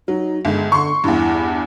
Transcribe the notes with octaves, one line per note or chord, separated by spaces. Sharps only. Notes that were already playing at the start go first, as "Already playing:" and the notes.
F#3 D#4
G1 G#3
D3 C6 C#6
E2 G2 E4